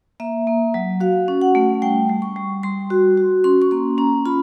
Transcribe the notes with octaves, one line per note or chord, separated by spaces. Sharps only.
A#3 E5
A#3
F#3
F#4 F5
C#4
F#5
A3
G3 G5
G3
C#6
G3
G3 C6
F#4
F#4
C#4 C6
C#6
A#3 C6
C#4 A#5
F4 B5